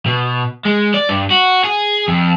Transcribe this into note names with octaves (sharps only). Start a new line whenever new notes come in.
B2
G#3
D5
G2
F#4
G#4
F2